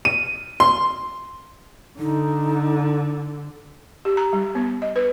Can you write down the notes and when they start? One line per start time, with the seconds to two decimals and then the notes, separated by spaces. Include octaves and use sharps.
0.05 D#7
0.60 C6
1.99 D3 D#4
4.05 G4
4.17 A#5
4.33 G3
4.55 B3
4.82 D#5
4.96 B4